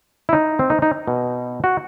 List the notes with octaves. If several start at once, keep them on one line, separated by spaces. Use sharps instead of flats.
E4
D#4
C4
D#4
D#4
B2
F#4